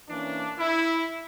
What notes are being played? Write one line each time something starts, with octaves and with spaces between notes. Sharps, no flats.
E3 A#3 C#4 D4
E4